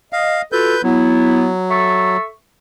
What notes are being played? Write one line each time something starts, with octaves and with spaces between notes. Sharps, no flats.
D#5 F5
F4 F#4 A4 B4 G6
F#3 B3 E4
A4 E5 C#6